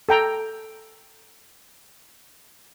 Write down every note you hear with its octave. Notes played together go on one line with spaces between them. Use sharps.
A4 G5 A#5